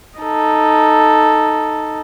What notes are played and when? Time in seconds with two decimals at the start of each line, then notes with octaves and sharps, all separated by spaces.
0.20 D#4 A4